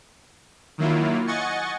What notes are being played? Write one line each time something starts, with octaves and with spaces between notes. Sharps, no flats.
D#3 F#3 A#3 E4 F4
D#5 F#5 G#5 C#6 A6 C#7